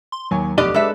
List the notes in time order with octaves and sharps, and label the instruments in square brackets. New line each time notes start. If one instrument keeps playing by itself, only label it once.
[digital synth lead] C6
[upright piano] D#2 G#5 C#6 [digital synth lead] F#3
[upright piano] F1 B1 [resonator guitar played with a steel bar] B2 [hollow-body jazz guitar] D4 D5 D#5 [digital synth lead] G4
[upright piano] G#3 F#6 [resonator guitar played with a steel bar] A4 B4 E5